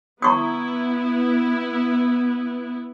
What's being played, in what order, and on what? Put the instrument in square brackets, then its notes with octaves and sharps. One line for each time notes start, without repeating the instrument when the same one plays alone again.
[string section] B3 E4 [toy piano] A#5 C#6 D#6